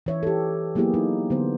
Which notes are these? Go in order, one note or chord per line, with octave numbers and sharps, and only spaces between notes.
E3 C#5 E5
G4 A4
F#3 A#3 B3 E4 G4 G#4
D#4
D3 F#3 B3 C5